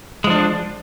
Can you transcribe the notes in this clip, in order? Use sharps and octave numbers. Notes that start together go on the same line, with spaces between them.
F3 G#3 D4